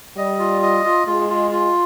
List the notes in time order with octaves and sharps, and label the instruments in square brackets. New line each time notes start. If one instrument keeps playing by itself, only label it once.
[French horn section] G3 [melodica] D#5
[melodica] F4
D#5
F4
[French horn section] G#3 [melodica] F4
[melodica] F4
F4